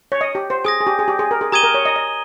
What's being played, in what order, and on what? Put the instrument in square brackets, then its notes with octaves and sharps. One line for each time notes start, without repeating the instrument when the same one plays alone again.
[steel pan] C#5
D#5
G4
C5
[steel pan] G#4 [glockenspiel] G#5 D#6 A#6
[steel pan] G#4
G4
G#4
G4
G#4
A#4
G#4
[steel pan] G4 [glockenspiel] A#5 D#6 G#6 D#7 G7
[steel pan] A#4
C#5
D#5
D#5